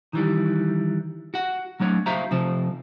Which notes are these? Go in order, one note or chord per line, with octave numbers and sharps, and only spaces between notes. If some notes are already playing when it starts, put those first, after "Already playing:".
D#3 E3 G3
F#4 F#5
F#3 A3 D4 C#5
F#4 C5 E5 F5 A#5
C3 F3 C5